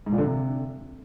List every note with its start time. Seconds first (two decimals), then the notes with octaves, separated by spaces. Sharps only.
0.06 G#2
0.12 A#2
0.18 D3
0.24 C3